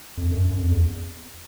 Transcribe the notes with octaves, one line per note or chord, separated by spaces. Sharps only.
F2
F#2
F#2
F2
E2